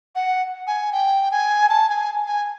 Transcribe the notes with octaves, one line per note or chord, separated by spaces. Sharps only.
F#5
G#5
G5
G#5
A5
G#5
G#5